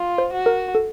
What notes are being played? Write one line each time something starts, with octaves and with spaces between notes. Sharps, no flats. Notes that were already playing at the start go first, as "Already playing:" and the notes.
Already playing: F4
C5
F#4
A#4
A4